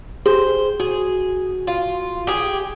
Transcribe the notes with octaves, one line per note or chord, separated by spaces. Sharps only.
G4 G#4 C5
F#4 G#4
F4
G4 G#4